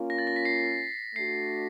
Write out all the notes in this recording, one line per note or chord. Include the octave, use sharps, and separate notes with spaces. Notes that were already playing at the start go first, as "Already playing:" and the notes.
Already playing: A#3 C#4 F4
A#6
A6
A#6
B6
C7
A3 D4 F#4 C7